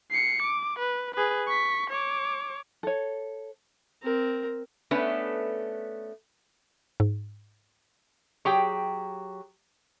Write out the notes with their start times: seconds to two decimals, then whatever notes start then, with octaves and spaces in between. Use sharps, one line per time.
0.10 C7 C#7
0.43 D6
0.79 B4
1.15 G#4 B4
1.47 C#6 B6
1.90 C#5 D6
2.83 A4 C#5
4.03 C4 A#4
4.91 A3 B3 C#4 D4 B4
7.00 G#2
8.45 F#3 G4 G#4 G5